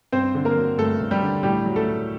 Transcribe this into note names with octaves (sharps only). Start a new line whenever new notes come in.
G2 C4 C5
D3
A#3 A#4
F#3
G2 A3 A4
G2
G3 G4
D3
A2 G3 G4
F#3
A3 A4
A2